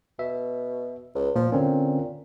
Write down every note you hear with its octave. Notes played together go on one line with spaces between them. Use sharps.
B2 E5
C#2
A#2 F3
A#2 D3 C4 C#4